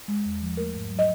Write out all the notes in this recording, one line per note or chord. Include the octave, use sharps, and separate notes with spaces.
G#3
E2
F3
A3 A#4
G#2
F#3
D#5